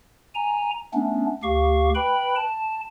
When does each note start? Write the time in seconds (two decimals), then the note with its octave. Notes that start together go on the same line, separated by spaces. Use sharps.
0.35 G#5 A#5
0.93 A3 B3 C#4 D4
1.43 D2 G4 F5 C#6
1.95 B4 G5 B5
2.36 A5